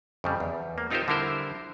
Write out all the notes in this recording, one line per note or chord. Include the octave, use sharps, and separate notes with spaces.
F2 C#3 G3
E2
A#3
C4 D#4 F4 G4 A#4 C5
D3 G3 E4 A#4 C5